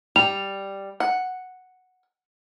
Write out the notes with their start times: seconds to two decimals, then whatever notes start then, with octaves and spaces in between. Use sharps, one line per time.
0.16 G3 F7
1.00 F#5